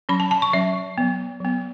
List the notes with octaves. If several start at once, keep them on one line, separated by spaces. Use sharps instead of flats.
F#3 C#4 B5
A5
A5
C#6
F#3 C#4 E5
F#3 B3
F#3 B3